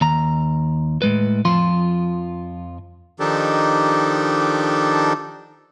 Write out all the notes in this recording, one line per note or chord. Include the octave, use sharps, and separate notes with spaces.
D#2 A#5
A2 G#3 B4
F2 F3 F4 C6
D#3 F3 D4 D#4 G4 A4